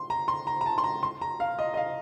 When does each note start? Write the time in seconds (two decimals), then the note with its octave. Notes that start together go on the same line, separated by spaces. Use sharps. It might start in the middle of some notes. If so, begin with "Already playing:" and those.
Already playing: C6
0.10 A#5
0.28 C6
0.47 A#5
0.61 A#5
0.66 A5
0.78 C6
0.84 A#5
1.03 C6
1.21 A#5
1.40 F5
1.59 D#5
1.74 D#5
1.77 F5